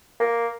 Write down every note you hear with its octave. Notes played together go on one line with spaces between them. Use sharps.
A#3